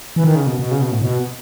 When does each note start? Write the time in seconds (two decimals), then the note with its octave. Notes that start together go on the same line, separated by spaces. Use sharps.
0.16 E3
0.24 D#3
0.35 C#3
0.47 B2
0.59 B2
0.71 C#3
0.82 B2
0.92 A2
1.02 B2